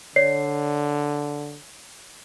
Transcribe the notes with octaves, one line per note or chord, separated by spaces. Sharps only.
D3 C#5 D5 C7